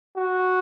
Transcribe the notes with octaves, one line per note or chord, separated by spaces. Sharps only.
F#4